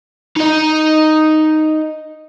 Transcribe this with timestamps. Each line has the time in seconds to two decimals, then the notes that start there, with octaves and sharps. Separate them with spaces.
0.36 D#4 D#5